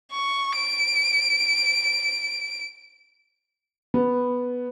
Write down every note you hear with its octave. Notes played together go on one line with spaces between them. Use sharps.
C#6
D7
B3